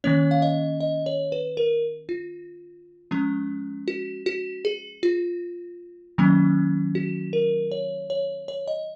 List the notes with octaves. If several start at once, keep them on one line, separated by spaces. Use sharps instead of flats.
D#3 A#3 C#4 C#5
F5
D#5
D#5
C#5
B4
A#4
F4
F3 G#3 C#4
F#4
F#4
G#4
F4
D#3 F#3 A#3 C#4
F#4
A#4
C#5
C#5
C#5
D#5